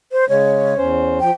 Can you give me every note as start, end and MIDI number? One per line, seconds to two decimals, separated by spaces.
0.12 0.28 72
0.29 0.74 49
0.29 0.74 56
0.29 0.87 73
0.78 1.19 40
0.78 1.19 61
0.78 1.19 72
1.20 1.31 53
1.20 1.32 79